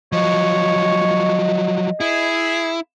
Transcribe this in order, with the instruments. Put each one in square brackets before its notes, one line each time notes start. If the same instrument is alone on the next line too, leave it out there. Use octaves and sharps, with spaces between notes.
[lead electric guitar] F3 F#3 [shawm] C#5 [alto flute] D#5
[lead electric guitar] E4 [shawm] G#4